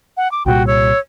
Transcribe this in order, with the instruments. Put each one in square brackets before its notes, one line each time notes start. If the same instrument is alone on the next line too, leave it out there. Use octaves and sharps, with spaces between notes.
[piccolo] F#5
D6
[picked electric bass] C2 A#2 G3 [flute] F#4 [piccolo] G5
[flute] C#5 [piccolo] E6